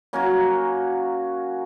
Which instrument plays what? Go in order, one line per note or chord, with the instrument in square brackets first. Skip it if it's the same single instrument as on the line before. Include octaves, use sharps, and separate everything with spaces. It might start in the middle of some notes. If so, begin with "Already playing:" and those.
[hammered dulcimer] F#3 A#3 C#4 F#4